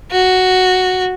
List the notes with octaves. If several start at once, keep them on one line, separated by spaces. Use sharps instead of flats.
F#4